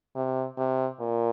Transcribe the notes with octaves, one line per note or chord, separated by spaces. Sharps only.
C3
C3
A#2